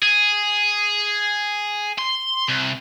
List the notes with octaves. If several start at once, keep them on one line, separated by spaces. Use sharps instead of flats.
G#4
C6
C2